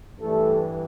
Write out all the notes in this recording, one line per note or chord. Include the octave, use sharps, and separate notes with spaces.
G2 E3 G3 A3 A4